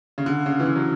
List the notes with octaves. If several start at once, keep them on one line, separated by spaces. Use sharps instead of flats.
C#3
D3
C#3
E3
D3
F#3